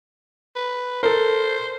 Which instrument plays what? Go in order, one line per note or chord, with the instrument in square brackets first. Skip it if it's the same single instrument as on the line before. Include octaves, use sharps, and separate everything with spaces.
[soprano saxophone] B4
[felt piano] A4 A#4 [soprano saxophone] C5